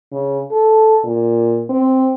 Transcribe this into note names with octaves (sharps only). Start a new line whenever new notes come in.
C#3
A4
A#2
C4